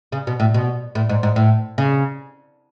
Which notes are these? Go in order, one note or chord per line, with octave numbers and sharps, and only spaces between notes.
C#3
B2
A2
B2
A2
G#2
G#2
A2
C#3